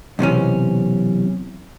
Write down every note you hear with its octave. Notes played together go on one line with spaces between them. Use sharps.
B1 C3 E3 C#4